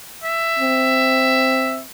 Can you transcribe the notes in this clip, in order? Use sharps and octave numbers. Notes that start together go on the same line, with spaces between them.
E5
C4